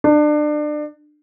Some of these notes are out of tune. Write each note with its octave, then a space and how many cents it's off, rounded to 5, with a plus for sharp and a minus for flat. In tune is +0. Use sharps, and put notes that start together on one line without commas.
D4 +30